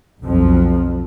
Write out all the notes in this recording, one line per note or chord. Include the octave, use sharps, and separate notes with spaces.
B1 F2 F3